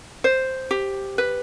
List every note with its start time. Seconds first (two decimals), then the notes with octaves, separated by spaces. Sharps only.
0.24 C5
0.71 G4
1.18 B4